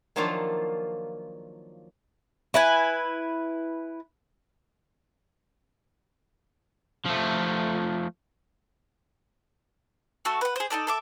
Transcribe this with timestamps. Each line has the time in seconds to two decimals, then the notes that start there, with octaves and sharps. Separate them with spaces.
0.16 D#3 F3 F#3 A#3 D4 F4
2.54 E4 B4 G#5
7.06 F3 A3
10.25 A3 F#4 A4
10.41 B4 F#5
10.56 G#4 C5
10.70 D#4 G4 A4 D5
10.87 A4 E5 D6